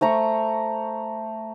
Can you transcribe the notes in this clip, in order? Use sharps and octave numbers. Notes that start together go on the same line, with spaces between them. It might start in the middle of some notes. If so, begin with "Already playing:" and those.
A3 C5 A#5 C#6